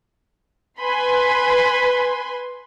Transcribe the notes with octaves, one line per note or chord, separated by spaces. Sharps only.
B4 G#5 B5 C6